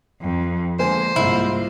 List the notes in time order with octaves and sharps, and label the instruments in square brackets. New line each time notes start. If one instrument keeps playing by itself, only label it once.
[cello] F2
[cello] D3 G#3 [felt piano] A#3 G#5 [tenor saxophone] C5
[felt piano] C2 G#2 [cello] A#3 F4 [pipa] E4